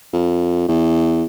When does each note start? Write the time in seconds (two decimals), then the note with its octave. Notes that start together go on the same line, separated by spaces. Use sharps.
0.13 F2
0.68 E2